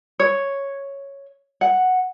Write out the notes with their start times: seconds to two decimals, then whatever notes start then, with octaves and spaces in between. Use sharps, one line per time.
0.19 C#5
1.61 F#5